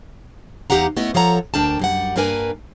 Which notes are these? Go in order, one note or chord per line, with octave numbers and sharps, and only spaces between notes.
E2 D#4 G4 F5 F#5 A#5
A3 B3 C#4 E4 D#5
A#2 F3 A4 C#5 F#5 A#5
D2 D4 A#4 G5 A5
F#2 G3 F#5
G2 A#3 D4 A#4 B4 G#5